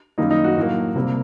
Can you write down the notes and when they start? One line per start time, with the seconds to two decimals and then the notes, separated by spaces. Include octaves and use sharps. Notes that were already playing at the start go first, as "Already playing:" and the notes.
0.18 F#2 D#3 G3 A#3 D#4
0.31 D#4
0.44 F#4
0.57 A2 F#3 A#3
0.95 C3 G3 A#3